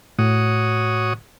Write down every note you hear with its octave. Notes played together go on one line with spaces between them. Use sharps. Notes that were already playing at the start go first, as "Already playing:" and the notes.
A2 F#4 C#5 D#6